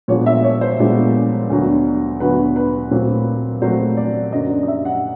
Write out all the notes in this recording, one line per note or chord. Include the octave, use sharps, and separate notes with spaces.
A#2 F3 G#3 B3 D4 C#5
E5
C#5
C5
A#2 F3 G#3 B3 D4
D2 D3 F#3 B3
D2 D3 F#3 B3 B4
B4
A#2 F#3 A3 C4
A#2 F#3 A3 C4 C5
D5
F#2 D3 F#3 A#3 D#5
D5
D#5
E5
F#5